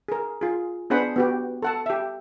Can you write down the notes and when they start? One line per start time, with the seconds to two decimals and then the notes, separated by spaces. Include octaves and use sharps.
0.08 G#4 A#4
0.41 F4 G#4
0.90 B3 D4 G#4 C5 F#5 B5
1.16 B3 F#4 G4
1.62 A4 F#5 A5
1.86 G4 E5